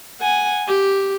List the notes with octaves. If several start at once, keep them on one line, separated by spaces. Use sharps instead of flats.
F#5 G#5
G4